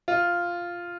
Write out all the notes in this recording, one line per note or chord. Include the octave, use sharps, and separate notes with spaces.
F4